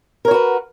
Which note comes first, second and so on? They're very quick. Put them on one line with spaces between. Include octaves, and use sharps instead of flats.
A#4 C#5 F#4 B4